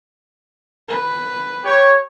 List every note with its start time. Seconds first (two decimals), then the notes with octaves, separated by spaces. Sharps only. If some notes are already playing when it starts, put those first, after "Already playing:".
0.88 B4
1.64 G4 C#5